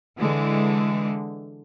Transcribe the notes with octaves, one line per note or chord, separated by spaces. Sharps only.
D3 E3 G#3